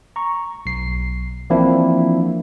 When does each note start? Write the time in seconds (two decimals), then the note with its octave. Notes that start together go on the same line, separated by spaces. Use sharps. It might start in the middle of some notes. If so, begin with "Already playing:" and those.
0.16 A#5 C#6
0.66 B1 C7
1.50 E3 F3 A#3 C4 D4 E4